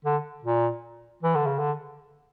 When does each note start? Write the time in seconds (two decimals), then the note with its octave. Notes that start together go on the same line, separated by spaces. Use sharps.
0.05 D3
0.44 A#2
1.23 E3
1.35 D3
1.46 C#3
1.59 D3